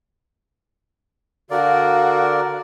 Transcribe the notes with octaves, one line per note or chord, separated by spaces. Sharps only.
D3 F#4 A#4 D5 F5